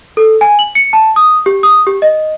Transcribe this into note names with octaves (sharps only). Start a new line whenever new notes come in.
A4
G#5
F#7
C#7
A5
D#6
G4
D#6
G4
D#5